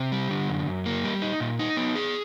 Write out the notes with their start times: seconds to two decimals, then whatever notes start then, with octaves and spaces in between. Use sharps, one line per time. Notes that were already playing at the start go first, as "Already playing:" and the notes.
Already playing: C3
0.12 G3
0.31 D3
0.48 F#2
0.66 F#2
0.86 A#3
1.04 G3
1.22 D#4
1.40 A#2
1.59 D#4
1.77 B3
1.95 G#4